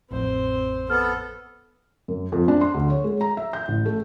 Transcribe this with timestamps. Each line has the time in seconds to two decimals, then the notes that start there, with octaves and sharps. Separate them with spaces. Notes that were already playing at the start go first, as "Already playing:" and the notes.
0.11 A1 F2 A2 C4 C5
0.90 B3 A4 F6
2.08 F#2
2.32 F2
2.48 D4
2.61 C6
2.74 D2
2.90 C#5
3.04 G#3
3.21 A#5
3.37 E5
3.53 G6
3.68 A1
3.86 A3